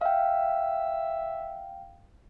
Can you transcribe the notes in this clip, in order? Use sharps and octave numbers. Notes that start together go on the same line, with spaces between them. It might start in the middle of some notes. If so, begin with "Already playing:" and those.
E5 F5 G5